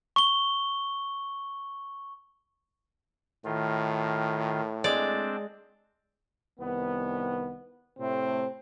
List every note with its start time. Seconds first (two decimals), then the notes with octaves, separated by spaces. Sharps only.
0.16 C#6 G7
3.45 A2 D#3 F4
4.84 G#3 C4 D4 D5
6.59 C2 D#3 B3
7.99 A2 C3 A3 C4